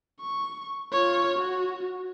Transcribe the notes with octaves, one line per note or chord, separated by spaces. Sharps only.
C#6
F4 C#5
F#4